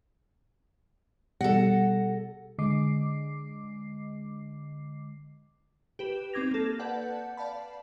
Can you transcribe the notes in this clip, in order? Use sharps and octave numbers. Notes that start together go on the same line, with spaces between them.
B2 G3 A4 F#5 A#6
D3 G#3 D#5 D6 C7
G4 B4 E7
C4 D#4 D6 G#6 A#6 F7
A#3 A4
B4 D5 F#5 A5 G6
D5 F5 A5 B5